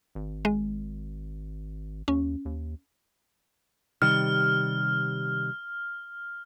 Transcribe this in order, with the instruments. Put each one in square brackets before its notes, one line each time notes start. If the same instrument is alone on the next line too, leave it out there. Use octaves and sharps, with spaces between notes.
[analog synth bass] G#1
[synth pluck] G#3
[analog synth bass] D#2 [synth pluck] C#4
[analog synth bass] D#2
[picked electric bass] C3 D#3 G3 [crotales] F6